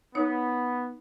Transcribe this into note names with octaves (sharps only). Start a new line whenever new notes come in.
B3 D#4 C#5